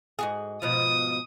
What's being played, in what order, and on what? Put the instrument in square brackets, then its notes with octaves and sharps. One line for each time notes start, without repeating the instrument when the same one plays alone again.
[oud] G#2 F#4 G#4
[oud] G#2 B2 F3 [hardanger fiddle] D#6